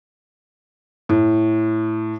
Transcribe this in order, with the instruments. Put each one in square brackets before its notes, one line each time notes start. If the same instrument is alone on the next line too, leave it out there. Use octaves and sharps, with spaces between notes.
[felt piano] A2